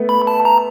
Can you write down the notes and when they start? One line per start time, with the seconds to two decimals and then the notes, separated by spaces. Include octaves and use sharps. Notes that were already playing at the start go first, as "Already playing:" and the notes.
Already playing: A3 B3
0.09 B5
0.27 A5
0.45 A#5